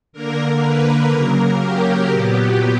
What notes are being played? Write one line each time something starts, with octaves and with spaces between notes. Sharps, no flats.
D3 A#3 A#4
B4
C#3 F#3 A#3 A#4
G4
A#2 F#3 B3 G4